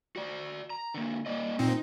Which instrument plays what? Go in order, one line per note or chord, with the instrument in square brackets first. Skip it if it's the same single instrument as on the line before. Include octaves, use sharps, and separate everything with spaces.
[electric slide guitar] F#4 D5
A#5
D3 A#3
A#3 D5 D#5
[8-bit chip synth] A#2 C4 [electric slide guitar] D#4